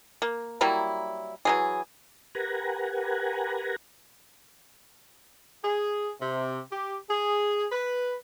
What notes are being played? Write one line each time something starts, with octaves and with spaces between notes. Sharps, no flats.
A#3
F#3 G3 A#3 E4
E3 F#3 G#4
G4 A#4 B4 F#5 G#5 A#5
G#4
C3
G4
G#4
B4